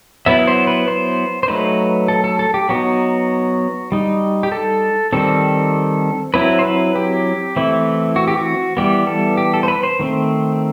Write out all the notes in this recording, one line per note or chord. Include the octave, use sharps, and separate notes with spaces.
F#3 B3 E4 E5
C5
B4
C5
C5
F#3 A3 D#4 B4
A4
A4
A4
G4
F#3 B3 D#4 F#4
G3 D#4
G4
A4
D#3 G3 C4 A4
F#3 C4 E4 B4
C5
B4
G4
E3 A3 C4 E4
F#4
G4
F#4
E3 G3 B3 G4
A4
G4
A4
C5
B4
C5
D#3 A3 C4